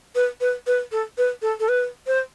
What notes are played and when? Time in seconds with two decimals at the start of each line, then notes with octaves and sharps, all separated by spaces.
0.15 B4
0.41 B4
0.67 B4
0.92 A4
1.18 B4
1.42 A4
1.60 A4
1.68 B4
2.07 C5